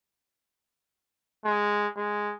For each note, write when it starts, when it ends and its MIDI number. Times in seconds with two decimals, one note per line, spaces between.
1.45 1.87 56
1.97 2.34 56